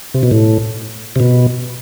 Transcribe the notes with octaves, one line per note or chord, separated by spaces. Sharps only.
C3
B2
A2
C3
B2